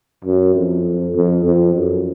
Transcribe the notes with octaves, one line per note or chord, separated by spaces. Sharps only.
F#2
F2
F2
F2
F#2